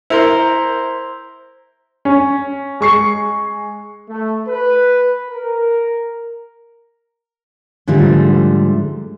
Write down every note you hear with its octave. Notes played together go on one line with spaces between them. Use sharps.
E4 A#4 C5 A#5 C6
C#4
G#3 C#6 C7
A3
B4
A#4
G#2 D3 F3 G3 A3